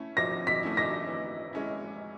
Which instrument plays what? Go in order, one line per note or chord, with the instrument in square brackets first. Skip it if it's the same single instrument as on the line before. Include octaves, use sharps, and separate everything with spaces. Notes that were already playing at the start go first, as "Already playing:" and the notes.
Already playing: [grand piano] A3 C#4 E4
[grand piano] F3 [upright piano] A#6
[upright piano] B6
[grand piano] A3 C#4 E4
[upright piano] A#6
[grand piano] E3
G#3 C#4 E4